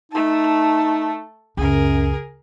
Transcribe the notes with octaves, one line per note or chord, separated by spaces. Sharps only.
A3 D#4 A5
C#2 F#2 G#4 A#4